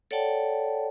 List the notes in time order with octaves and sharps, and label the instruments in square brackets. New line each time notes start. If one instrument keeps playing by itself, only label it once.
[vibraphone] A4 C#5 D5 F#5 G5 A5